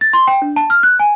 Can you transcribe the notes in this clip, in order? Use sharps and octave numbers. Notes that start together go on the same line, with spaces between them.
A6
C6
G5
D4
A5
F6
F#6
G#5